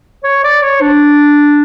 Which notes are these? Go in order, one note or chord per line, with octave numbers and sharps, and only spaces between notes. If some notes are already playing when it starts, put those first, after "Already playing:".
C#5
D5
C#5
D4